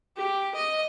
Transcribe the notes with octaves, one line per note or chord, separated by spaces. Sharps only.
G4
D#5